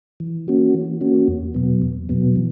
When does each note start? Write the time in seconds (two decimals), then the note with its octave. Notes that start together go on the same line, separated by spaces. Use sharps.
0.20 E3
0.48 A#3 C#4 F#4
0.74 E3
1.01 A#3 C#4 F#4
1.28 E2
1.54 B2 F#3 B3
1.82 E2
2.09 B2 F#3 B3
2.36 E3